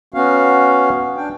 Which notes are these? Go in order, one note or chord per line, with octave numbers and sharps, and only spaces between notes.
B3 C#4 F#4 F5
D4 G5